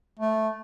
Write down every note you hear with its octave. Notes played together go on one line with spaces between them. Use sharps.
A3